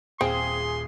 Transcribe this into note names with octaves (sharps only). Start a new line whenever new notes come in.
D#1 C4 G#4 F5 C6